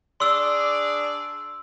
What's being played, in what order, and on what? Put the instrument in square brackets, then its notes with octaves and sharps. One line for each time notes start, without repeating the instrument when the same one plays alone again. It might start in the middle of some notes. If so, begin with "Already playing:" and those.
[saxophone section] D4 G#4 D5 [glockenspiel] C6 E6